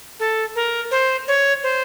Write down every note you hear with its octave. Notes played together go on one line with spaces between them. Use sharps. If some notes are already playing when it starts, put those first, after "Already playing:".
A4
A#4
C5
C#5
C5